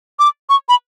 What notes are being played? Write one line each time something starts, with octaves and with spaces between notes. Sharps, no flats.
D6
C#6
B5